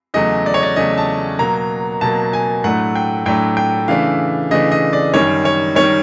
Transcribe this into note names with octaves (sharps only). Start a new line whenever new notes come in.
E2 C#3 F#3 A3 D#5
D5
C#5
D5
E2 C#3 F#3 A3 D#5
A5
B2 F#3 A#3 A#5
B2 F#3 A#3 A5
G#5
A2 F#3 A3 D4 F#5
G5
A2 F#3 A3 D4 G5
G5
C#3 E3 A3 D4 F5
C#3 E3 A3 D4 D#5
D#5
D5
F#2 D#3 G3 C#5
C#5
D#3 G3 C#5